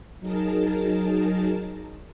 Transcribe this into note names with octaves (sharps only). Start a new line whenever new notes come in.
F#3 D#4 G#4 A#4 A5